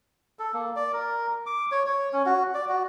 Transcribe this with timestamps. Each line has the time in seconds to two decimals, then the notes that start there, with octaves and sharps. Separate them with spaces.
0.39 A4
0.54 A#3
0.76 D5
0.93 A#4
1.46 D6
1.71 C#5
1.86 C#5
2.13 C#4
2.26 F#4
2.54 D5
2.69 F#4